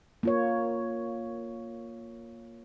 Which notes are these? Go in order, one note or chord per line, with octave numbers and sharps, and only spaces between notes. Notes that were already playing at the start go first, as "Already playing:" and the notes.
A#3 F4 C#5